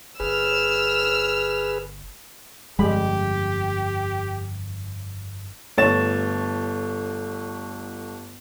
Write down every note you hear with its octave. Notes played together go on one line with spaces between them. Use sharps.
G1 G#4 B4 E6 F6
G1 F2 G3 G#3 G4 B5
G1 A3 C#5 A6 E7